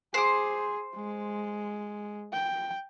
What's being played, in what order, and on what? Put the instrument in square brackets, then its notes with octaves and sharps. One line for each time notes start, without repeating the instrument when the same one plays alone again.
[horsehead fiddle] G#4 [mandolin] C5 D6
[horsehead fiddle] G#3
G5